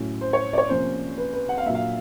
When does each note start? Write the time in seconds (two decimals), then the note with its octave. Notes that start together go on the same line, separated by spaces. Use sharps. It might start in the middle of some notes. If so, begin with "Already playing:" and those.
Already playing: A2 F#3 A3 C#4
0.21 C5
0.33 C#5
0.53 D5
0.58 C#5
0.69 C3 F3 A#3 C#4 C5
1.18 B4
1.33 B4
1.49 F#5
1.58 F5
1.65 A#2 F#3 A#3 D4 E5
1.75 F5